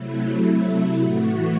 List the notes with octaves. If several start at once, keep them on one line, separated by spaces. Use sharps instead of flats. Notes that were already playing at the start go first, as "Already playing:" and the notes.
Already playing: C3 F#3 A3 E4
E4
A2 E3 A3 F#4